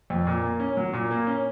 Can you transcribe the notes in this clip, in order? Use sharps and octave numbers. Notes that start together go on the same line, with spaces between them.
F2
A#2
A#3
C#4
F#3
A#2
A#3
C#4